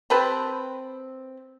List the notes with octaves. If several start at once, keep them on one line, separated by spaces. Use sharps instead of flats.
C4 G4 B4 A5